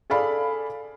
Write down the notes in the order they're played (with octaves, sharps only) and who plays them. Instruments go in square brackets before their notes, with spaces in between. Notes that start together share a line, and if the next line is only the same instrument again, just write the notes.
[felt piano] G#4 A4 D5 F5 B5